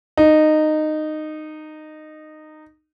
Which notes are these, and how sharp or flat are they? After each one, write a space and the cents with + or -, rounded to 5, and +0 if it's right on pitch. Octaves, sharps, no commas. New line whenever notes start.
D#4 -15